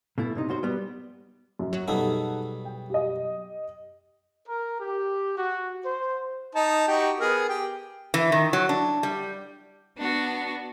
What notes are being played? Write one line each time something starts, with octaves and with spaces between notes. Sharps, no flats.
B2 A3 E4
G2 C3 D#4
B1 F#4 C5
G3 B3
F#2
F#3
B2 G3 D#4 G#4 A4 F#5
G5
G4 D#5
A#4
G4
F#4
C5
D#4 A5
D#4 F#4 G4
B3 G#4 A#4
G4
E3
D#3
F#3
D4
G3
B3 D4 F#4